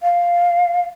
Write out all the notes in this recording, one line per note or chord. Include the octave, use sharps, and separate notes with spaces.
F5